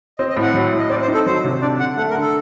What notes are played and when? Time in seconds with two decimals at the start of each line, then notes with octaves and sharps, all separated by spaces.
0.18 C4 D#5
0.30 D#5
0.37 A2
0.42 F#5
0.54 F#3
0.73 A2
0.79 D#5
0.90 C4 D5
1.02 C5
1.08 D#4
1.14 A4
1.26 F#3 C5
1.44 C3
1.62 D4 D5
1.80 D3 F#5
1.97 A3 F#5
2.10 A#4
2.15 D3
2.21 A4